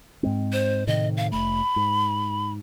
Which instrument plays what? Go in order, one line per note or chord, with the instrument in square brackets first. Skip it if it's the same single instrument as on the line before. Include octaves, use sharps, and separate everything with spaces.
[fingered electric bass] G#2 G#3 C4
[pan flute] C5
[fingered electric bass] A2 C3 D#3 [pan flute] D#5
[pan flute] F5
[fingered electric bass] F1 A3 [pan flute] B5
[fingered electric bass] G#2